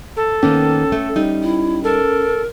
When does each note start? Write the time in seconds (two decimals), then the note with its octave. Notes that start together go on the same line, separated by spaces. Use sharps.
0.16 A4
0.43 D#3 A#3 B3 C#4
0.92 A3
1.16 G3 D#4
1.43 E4
1.84 A4 A#4